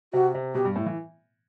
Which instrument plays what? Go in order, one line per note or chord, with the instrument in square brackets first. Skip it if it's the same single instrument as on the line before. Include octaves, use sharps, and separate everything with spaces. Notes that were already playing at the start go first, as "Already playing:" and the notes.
[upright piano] C3 [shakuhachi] F#4
[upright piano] C3
[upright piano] B2 [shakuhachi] G4
[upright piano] G2
A2
E3